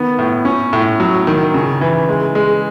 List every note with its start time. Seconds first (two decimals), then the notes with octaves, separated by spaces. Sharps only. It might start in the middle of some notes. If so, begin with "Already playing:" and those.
Already playing: D#3 B3
0.19 A2
0.45 C#4
0.73 A2
1.00 F#3
1.27 D#3
1.54 C#3
1.81 E3
2.09 G#3
2.35 G#3